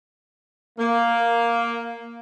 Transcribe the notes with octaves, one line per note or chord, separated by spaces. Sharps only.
A#3